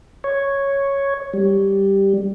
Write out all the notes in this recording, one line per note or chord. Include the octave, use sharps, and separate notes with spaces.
C#5
G3